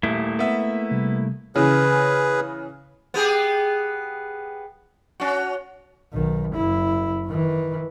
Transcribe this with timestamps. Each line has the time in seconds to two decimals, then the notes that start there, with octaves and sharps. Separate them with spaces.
0.03 D#1 A3 A#3 E4
0.39 B3 E5
0.91 C3 G3
1.56 C#3 E3 C#4 G#4 B4
3.14 B3 G4 G#4
5.20 C#4 F#4
6.13 B1 D#3
6.54 F#1 E4
7.27 D#3 E3